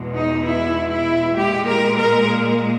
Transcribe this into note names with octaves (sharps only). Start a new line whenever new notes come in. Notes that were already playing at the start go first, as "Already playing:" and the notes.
Already playing: E2 B2 G#3
D#4
E4
E4
A#2 G#3 G4
A#4
A#4